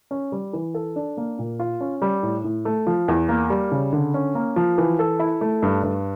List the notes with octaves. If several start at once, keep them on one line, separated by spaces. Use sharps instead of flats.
C#4
G3
E3
A4
D4
A#3
A#2
F4
C#4
G3
A2
A2
A3
F3
E2
A#3
G3
C#3
D3
C#4
A#3
F3
E3
A4
E4
A3
G2
G2